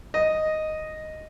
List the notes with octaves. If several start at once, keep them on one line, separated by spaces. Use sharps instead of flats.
D#5